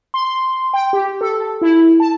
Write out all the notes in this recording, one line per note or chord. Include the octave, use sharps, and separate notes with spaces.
C6
G5
G4
A4
E4
A5